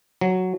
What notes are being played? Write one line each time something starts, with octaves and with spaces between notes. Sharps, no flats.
F#3